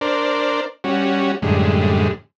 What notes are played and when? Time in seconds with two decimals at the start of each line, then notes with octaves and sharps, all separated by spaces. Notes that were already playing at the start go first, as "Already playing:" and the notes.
0.01 D4 A#4 C5 D5
0.84 G3 C#4 F#4
1.42 F#2 A2 D3 G3 G#3